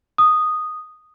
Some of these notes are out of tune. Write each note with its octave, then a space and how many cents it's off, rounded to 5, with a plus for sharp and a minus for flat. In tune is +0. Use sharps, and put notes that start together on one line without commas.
D#6 -5